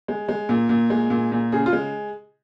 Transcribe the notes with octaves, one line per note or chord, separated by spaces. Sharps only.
G#3
G#3
A#2
A#2
G#3
A#2
A#2
C#3 G#4
F4
G#3